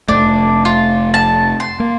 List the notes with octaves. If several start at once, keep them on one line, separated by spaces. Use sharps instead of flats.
F1 F2 A3 D4
F4
A5
C6
A#3